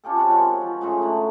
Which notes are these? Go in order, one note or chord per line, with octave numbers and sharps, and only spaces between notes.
C#4 F4 G4 A4
C3 F#4 F#5 A5
D#3 G#3 C4 C#4
F3
A2 C#3 F#3 G#3
D3 A3